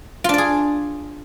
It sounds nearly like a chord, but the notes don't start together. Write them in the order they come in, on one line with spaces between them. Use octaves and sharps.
F4 D4 D5 G#4